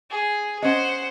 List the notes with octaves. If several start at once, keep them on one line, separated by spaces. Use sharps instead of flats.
G#4
C#4 C5 D#5 F#5